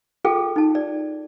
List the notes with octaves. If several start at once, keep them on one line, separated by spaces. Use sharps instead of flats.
F4 G#4 A4 G5
D#4 A5
D5